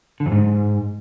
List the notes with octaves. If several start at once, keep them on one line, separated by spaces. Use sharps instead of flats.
D3
F2
G#2